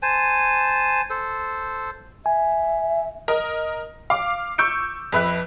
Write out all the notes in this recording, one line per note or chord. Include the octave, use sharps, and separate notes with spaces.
C5 G#5 A5
A4 C5
E5 G#5
A#4 D#5
F5 D6
C#6 E6 G6 C#7 D7
F2 B4 E5 F#6